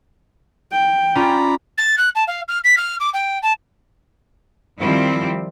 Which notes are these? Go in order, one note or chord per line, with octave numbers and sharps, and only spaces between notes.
G5
C#4 F4 D5 A#5 B5
A6
F#6
A5
F5
F6
B6
F6
D6
G5
A5
D#3 F3 G3 C4 E4